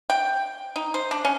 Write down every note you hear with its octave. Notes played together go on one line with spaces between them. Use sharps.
G5
D#4
C5
D4
C#4